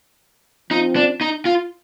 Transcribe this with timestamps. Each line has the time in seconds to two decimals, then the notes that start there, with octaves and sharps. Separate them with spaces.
0.70 F3 C4 D#4 F4
0.96 D4
1.21 D#4
1.45 F4